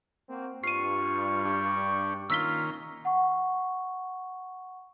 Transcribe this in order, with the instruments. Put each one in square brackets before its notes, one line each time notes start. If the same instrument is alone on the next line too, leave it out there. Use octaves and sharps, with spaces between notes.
[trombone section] A#3 C4 F#4
[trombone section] G2 [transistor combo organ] F4 [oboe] C#6 [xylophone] C7 D#7
[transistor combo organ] D4 G4
[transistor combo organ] D#3 A#3 C#4 [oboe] F4 [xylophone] E6 B6 G7
[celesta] F#5 C#6